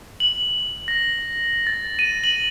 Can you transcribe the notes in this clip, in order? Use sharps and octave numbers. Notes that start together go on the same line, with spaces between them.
F#7
A#6
A6
D#7
F#7